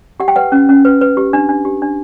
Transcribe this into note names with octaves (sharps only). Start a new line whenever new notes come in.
G4 F#5
G5
B4 F#5
C#4
C#4
B4
B4
G4
D4
D4
G4
D4